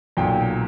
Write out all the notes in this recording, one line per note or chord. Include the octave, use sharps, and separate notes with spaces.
B1 A#2 F#3 G5